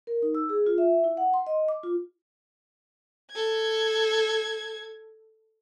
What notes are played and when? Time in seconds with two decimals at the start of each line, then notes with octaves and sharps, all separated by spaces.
0.07 A#4
0.22 D#4
0.35 E6
0.49 G#4
0.67 F4
0.78 E5
1.04 E4
1.17 F#5
1.34 C6
1.47 D#5
1.68 D6
1.83 F4
3.31 A4 G#6